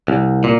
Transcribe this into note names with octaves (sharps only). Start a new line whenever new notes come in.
C2
A#2